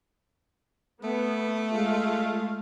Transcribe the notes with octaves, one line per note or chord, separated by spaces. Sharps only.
A3 B3
G#3 F4 F5